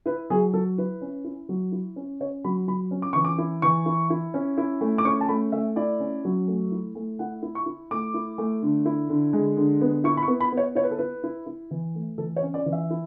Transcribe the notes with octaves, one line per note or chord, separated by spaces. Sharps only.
E4 B4
F#3 G#4
F#3 A4
E4 B4
C#4
E4
F#3
E4
C#4
C#4 C#5
F#3 B5
F#3 B5
C#4
D6
E3 C#6
D6
E4
E3 C#6
E4
E4
C#4
E4
A3
D6
C#4 C#6
A5
A3 B5
A3 E5
E4 D5
C#4
F#3
A3
E4
A3
E4 F#5
E4
C#6
E4
A3 D6
E4
A3
D3
E4
D3
G#3
D3
B3
E4 C#6
B5
C#6
B3
B5
B3
C#5
E4 C#5
B4
A4
E4 B4
E4
E4
E3
A3
E3 A4
C#5
C#4
D5
E3
E5
E4